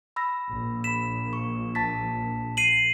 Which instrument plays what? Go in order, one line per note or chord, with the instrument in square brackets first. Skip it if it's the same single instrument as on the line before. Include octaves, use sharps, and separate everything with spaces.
[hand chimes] B5 E6 A#6
[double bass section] A#1
[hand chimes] B5 B6 [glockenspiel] E7
[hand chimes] C#6
A5 A6 B6
[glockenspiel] C7 D#7 F#7